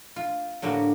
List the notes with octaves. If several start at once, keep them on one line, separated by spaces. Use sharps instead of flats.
F4
A2 D3 G3 A#3 F#4